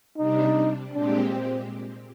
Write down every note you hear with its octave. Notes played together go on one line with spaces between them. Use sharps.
C3 G3 D4 D#4
A#2 G#3 C4 D4 G4
C4